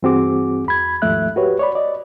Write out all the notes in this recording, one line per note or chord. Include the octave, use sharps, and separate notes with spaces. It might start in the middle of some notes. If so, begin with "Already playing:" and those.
G2 E3 C4 F#4 G#4 D6
E2 B5 G#6
D#2 G#2 F3 A3 E5 F#6
F#4 G4 B4 C#5
C#5 D5 B5
D5 D#5